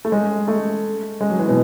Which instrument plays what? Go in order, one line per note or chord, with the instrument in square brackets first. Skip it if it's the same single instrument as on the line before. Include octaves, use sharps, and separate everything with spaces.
[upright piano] A3
G#3
A3
G#3
F#3
E3
B2